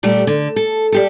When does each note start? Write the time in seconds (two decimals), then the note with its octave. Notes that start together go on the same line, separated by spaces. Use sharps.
0.03 A#2 G3 A3 G4
0.27 D3
0.56 A4
0.92 G3 G4 A4